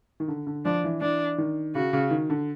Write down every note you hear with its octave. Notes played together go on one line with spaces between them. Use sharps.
D#3
D3
D3
F3 D4
E3
E3 D4
D#3
C#3 F#4
C#3
D#3
D3